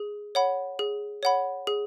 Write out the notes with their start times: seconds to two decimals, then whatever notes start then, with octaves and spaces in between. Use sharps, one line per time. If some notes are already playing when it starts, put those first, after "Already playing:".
Already playing: G#4
0.35 C#5 F#5 B5
0.79 G#4
1.23 C#5 F#5 B5
1.67 G#4